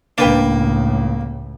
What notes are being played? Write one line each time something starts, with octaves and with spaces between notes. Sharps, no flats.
C#2 A2 A#3 D4 B4 G5